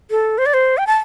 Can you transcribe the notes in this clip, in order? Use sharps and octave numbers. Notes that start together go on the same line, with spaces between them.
A4
C5
D5
C5
G5
A5